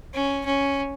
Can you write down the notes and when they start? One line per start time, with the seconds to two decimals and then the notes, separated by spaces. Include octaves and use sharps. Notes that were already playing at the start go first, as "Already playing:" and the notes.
0.14 C#4
0.45 C#4